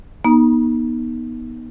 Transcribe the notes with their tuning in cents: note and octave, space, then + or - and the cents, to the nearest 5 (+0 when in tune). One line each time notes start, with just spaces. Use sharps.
B3 -35 D#4 +0 A#5 +40